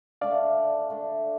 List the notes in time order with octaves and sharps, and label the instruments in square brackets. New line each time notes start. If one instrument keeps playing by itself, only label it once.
[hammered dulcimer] D3 A3 D4 [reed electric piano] D5 F5
[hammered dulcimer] D3 A3 D4